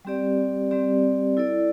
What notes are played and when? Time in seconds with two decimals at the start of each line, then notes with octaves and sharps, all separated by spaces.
0.05 G3 C4 G4 D5
0.71 G3 C4 G4 D5
1.37 E4 A4 D5